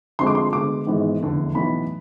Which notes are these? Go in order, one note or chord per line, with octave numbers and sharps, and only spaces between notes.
D2 D3 F3 G#3 C4 C6
D6
C6
D2 D3 G#3 B3 D6
G#1 G#2 E3 G#3 B3
F1 E2 D3 A3
B1 A2 E3 B3 B5